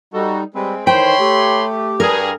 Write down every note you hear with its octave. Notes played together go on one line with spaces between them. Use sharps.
G3 D#4 F#4 A4
G3 G#3 C4 B4
D#3 E3 C5 C#5 G5 B5 C6
A3 G4
G2 G#4 A#4